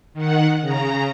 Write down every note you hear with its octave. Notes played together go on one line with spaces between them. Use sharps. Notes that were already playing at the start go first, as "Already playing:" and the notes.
D#3 F#5
C#3 A#5